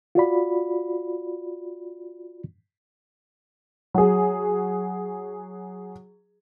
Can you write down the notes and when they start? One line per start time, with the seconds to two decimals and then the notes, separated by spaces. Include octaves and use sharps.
0.15 F4 F#4 D5 B5
3.94 F#3 G#4